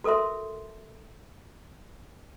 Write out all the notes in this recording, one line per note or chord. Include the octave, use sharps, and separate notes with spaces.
F#4 A4 A#4 E5 C6